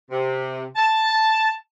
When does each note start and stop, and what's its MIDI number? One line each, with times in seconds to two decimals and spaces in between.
0.11 0.65 48
0.76 1.51 81